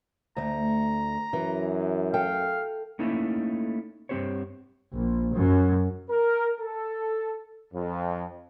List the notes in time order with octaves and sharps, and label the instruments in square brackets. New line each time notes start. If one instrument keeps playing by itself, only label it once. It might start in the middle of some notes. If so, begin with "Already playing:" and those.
[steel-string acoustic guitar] D2 A3 [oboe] A#5
[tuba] F#2 [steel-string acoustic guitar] E3
[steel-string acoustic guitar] A4 G5 [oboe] F5
[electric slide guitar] A3 A#3 C#4 D#4 E4 A4
G2 G#3 C4 G4 C5 C#5
[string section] A#1
F#2
[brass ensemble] A#4
A4
F2